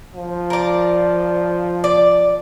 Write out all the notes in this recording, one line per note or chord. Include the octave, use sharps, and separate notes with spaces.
F3
A#4 D5
D5